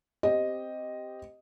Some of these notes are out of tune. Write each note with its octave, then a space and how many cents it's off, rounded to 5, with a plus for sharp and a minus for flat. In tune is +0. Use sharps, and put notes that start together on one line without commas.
C4 +0 G4 +0 D#5 +0